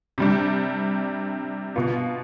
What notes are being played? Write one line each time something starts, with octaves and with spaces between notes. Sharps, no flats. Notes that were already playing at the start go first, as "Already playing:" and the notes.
C3 G3 D4
B2 B3 F4